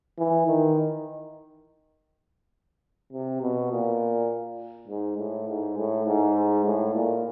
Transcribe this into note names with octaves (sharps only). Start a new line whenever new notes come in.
E3
D#3
C3
B2
A#2
G#2
A2
G#2
A2
G#2
A2
A#2